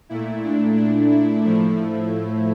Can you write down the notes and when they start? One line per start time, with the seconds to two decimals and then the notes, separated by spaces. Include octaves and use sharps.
0.09 A#2 A3 E4
0.44 D4
0.77 D4
1.12 E4
1.45 A2 F3 A3 E4